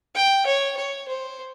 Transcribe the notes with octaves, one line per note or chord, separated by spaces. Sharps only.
G5
C#5
C#5
C5